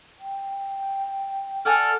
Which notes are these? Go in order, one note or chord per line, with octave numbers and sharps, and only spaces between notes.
G5
A4 D5 F#5 G#5 F6